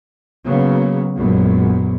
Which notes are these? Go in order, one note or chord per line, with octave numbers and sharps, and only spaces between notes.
C#3 F#3 A#3 B3
A#1 F#2 G#3 B3